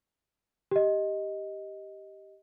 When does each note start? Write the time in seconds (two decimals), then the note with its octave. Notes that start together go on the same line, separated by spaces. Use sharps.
0.71 G4 D#5